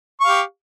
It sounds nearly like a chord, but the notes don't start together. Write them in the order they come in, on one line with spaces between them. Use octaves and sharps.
C#6 F5 G4